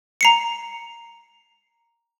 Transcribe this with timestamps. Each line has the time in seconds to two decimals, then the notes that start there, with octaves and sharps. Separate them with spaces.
0.21 A#5 C7 C#7